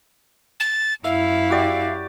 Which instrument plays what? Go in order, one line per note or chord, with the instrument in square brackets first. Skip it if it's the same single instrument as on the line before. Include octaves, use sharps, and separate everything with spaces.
[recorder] A6
[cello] F#2 E4 [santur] E5 [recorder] F5
[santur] F#4 G4 D5